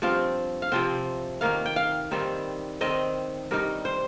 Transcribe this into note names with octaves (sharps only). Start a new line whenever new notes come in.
G2 F3 C4 F5
F5
C3 F3 C4 G5
D#3 A#3 D#4 F5
G5
F5
D#3 G3 C4 D#4
D#3 C4 D#4 D#5
G2 G3 D#4 A#4
C5